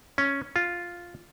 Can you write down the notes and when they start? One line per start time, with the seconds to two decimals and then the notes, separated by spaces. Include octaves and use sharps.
0.18 C#4
0.56 F4